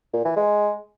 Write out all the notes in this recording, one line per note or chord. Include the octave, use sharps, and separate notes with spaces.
A#2
E3
G#3